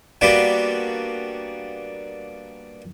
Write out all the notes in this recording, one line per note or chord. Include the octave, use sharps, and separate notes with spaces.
G3 A#3 B3 D4 F#4 G5